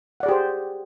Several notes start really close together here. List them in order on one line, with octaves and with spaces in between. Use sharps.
F#5 D5 G#4 G4 C5